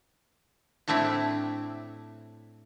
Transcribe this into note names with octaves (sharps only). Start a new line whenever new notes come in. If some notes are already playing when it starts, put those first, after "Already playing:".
A2 A3 C4 D4 E4